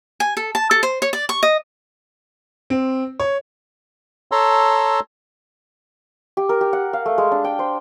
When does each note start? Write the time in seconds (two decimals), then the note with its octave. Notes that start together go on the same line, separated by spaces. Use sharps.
0.20 G#5
0.37 A4
0.55 A5
0.71 A4
0.83 C5
1.02 C#5
1.13 D5
1.29 C#6
1.43 D#5
2.70 C4
3.20 C#5
4.32 A4 C#5 A5 A#5 C6 E6
6.37 G4
6.49 A#4
6.61 G4
6.73 F#5
6.93 F5
7.06 A3
7.18 G#3
7.31 D4
7.44 G5
7.59 C5